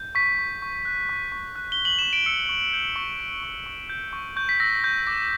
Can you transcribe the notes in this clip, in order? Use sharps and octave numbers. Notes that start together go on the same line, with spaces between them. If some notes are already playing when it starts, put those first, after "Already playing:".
Already playing: G6
C#6 B6
C#6
C#6
F#6
C#6
C#6
F#6
G7
F#6
F#7
C#6 E7
D7
E6 C#7
C#6
G6
C#6
G6
C#6
C#6
G6
C#6
C#6 G6
B6
E6 A#6
C#6 G6
D6 A#6